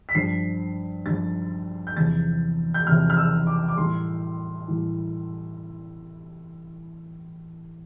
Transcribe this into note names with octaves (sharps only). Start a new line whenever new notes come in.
B6
G2 F3 C7
G2 F3 A6
G6
E2 C3 F3 A6
G6
E2 C3 F3 F6
F6
E6
D6
D6
A2 E3 G3 C6
A2 E3 G3